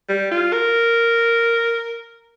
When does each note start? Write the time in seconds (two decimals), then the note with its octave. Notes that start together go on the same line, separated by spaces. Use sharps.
0.09 G3
0.32 F4
0.53 A#4